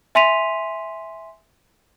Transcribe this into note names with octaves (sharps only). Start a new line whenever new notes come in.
E5 G#5 C6 B6 D#7 F7